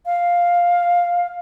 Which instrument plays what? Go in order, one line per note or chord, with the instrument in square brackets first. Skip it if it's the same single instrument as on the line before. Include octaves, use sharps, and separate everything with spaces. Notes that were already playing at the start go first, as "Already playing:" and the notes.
[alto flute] F5